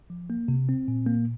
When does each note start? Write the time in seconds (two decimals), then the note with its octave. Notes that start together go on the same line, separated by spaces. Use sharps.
0.10 F3
0.30 A#3
0.48 C3
0.69 C4
0.88 A#2
1.06 A#3